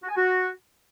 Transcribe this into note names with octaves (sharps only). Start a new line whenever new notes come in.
F#4
G#5
F#4